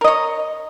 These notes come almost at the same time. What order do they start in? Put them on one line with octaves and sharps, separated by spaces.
A#4 D#5 C#5